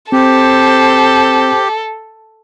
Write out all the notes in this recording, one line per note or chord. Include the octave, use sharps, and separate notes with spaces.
C4 G4 A4 C5